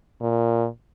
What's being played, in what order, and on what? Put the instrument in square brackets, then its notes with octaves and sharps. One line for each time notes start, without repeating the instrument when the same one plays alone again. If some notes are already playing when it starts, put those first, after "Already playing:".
[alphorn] A#2